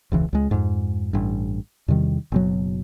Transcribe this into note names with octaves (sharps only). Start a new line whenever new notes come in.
E1 C#2 E3
C#2 G#3
F2 G#2
A1 G2
E2 C3 D#3 G3
F#1 B2 F#3